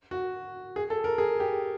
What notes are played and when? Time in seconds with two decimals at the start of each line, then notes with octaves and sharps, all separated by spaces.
0.11 F#4
0.76 G#4
0.90 A4
1.04 A#4
1.18 G#4
1.40 G4